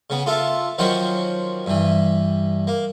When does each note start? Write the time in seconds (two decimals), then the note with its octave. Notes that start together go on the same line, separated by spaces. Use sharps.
0.10 C#3 B3
0.26 F4 A4 E5 F5
0.78 D#3 F3 F#3 C#4 F#4 C5
1.66 G2 E3
2.67 A#3